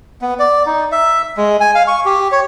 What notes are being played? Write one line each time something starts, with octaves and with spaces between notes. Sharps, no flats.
B3
D5
D#4
E5
G#3
G#5
F5
C#6
G4
C#5